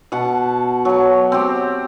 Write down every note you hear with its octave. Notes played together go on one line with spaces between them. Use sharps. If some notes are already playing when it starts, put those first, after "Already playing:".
B2 F#5 A5
F#3 C#5
C4 G4